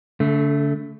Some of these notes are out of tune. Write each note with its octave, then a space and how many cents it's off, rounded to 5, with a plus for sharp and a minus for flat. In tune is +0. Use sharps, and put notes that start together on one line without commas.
D3 -40 A3 +0